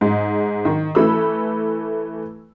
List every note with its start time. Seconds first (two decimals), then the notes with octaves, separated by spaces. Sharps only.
0.01 G#2 G#3
0.65 D#3
0.95 E3 A3 B5 E6